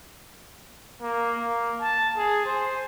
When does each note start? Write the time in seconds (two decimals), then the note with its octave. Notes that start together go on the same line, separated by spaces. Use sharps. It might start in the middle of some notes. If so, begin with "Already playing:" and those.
1.02 A#3
1.39 A#3
1.81 A5
2.17 G#4
2.46 C5